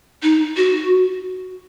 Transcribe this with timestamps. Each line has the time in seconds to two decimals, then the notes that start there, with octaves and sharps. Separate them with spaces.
0.23 D#4
0.57 F#4